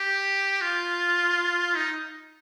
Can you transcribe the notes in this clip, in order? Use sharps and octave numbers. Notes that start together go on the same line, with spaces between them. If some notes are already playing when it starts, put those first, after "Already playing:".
Already playing: G4
F4
D#4